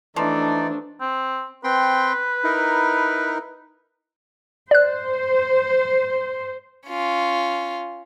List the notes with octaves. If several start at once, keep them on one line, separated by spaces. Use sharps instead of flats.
E3 F3 A3 D4 D#4 D5
C4
C4 B4 G5 C6
D#4 E4 A#4
C5 D5 F#6
C#4 F4